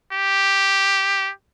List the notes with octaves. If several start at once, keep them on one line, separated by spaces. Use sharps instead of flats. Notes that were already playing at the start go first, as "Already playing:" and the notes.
G4